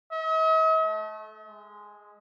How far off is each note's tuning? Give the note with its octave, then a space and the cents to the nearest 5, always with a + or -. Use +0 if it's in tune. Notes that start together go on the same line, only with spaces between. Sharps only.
D#5 +45
A3 -25
G#3 -5